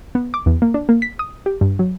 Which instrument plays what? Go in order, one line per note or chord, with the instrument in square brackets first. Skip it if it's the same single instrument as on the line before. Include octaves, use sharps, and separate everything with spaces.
[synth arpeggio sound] B3
D6
E2
A#3
D4
A#3
B6
D#6
G4
G2
F#3